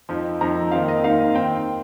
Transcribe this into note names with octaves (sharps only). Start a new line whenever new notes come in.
F2 F3 D#4
F2 F3 D#4 A#5
D#2 D#3 C4 D#4 F5
D#5
D#2 D#3 C4 D#4 F5
D#3 C4 G5